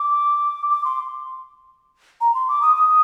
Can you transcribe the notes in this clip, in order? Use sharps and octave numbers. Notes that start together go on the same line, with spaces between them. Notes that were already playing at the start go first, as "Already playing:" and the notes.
Already playing: D6
D6
C6
A#5
C6
D6
D#6
D#6